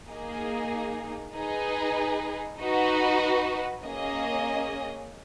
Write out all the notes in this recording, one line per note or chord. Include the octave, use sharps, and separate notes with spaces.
A#3 D#4 G#4
D#4 G#4 B4
D#4 F#4 B4
A#3 C#4 G#4 D#5